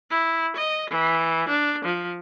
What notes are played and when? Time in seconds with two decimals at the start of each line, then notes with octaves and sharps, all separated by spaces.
0.11 E4
0.57 D#5
0.91 E3
1.49 D4
1.85 F3